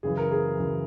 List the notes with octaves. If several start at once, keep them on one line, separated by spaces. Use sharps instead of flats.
F#2 C#3 E3 G#4
A#4
G#4
F#2 C#3 E3